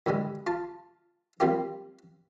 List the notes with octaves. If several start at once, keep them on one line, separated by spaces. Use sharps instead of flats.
A2 D3 G3 G#3
F4 A5
G3 A#3 C4 F4 G4